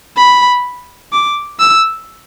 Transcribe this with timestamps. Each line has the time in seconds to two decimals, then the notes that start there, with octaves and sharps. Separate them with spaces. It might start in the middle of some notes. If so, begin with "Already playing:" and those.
0.17 B5
1.12 D6
1.60 E6